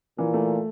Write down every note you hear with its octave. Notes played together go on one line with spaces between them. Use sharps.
A#2 E3
A3